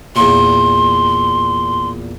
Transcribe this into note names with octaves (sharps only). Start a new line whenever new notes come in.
E2 A#2 C6